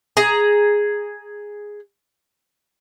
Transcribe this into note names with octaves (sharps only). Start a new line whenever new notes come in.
G#4 A#5